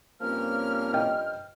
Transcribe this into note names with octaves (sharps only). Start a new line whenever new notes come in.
G2 F3 A#3 C4 C#4 F6
D#5 G5